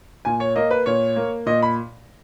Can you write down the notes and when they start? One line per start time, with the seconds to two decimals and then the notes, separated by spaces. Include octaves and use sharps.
0.25 A#2 G#5
0.40 C#5
0.56 A#3 D#5
0.71 B4
0.86 A#2 C#5
1.16 A#3
1.46 A#2 D#5
1.62 B5